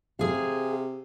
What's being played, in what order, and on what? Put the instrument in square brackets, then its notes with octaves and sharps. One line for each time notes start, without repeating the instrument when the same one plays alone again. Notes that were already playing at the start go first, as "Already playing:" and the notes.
[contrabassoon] C3 [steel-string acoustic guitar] G#4 F5